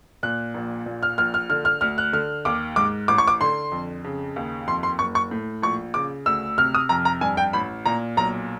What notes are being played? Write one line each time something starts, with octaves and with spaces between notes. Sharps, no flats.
A#2 F#6
A#1
A#2
F6
A#1 F6
F6
D3 F6
F6
D2 F6
F#6
D3 F6
D#2 D6
G#2 D6
A1 D6
C#6
D6
D3 C6
F2
C#3
D#2
F2 C6
C6
F#1 C#6
C#6
A2
A#1 C#6
C#3 D6
D2 E6
C3 F6
D#6
F2 A#5
A#5
G2 G#5
G5
A1 B5
A#2 A#5
B1 A#5